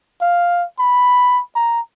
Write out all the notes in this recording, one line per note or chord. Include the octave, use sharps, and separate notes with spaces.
F5
B5
A#5